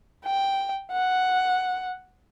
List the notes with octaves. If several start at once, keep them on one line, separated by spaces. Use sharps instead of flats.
G5
F#5